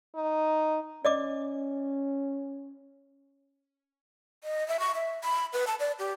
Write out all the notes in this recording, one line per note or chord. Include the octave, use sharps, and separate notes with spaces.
D#4
C#4 D5 D#5 D6
D#5
E5
C#6
E5
B5
B4
A5
D5
G4